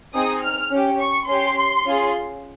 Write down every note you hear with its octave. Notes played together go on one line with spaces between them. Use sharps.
C4 D#4 G#4 D#6
F6
C#4 G4
C#6
C#4 G4 C6
C#4 F4 G#4